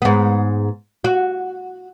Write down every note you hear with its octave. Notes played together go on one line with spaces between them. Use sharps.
G#2 B3
F#4